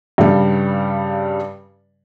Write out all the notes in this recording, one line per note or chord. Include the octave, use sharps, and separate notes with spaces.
G2 C#3 G3